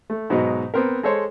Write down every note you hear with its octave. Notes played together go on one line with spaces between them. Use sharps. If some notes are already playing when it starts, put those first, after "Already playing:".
A3
G#2 B2 F#3 D#4
B3 C4 A#4
G#3 A4 C5 C#5